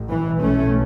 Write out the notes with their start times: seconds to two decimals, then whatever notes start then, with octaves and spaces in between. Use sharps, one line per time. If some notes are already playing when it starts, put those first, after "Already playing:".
Already playing: A1 A2
0.08 E3
0.41 B1 A2 A3 C#4